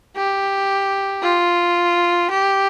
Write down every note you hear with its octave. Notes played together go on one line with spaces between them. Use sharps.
G4
F4
G4